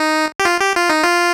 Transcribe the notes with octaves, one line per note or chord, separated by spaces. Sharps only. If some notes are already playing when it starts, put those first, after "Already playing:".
Already playing: D#4
G4
F4
G4
F4
D#4
F4